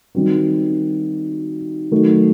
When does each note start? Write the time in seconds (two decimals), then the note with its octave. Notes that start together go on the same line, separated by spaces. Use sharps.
0.15 D#3 G3 C4 D#4 F#4
1.91 D#3 F#3 A3